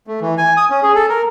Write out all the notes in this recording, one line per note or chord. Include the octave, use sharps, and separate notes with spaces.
A3
E3
G#5
D#6
C#4
G#4
A4
A#4